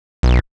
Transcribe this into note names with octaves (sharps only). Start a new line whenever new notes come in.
B1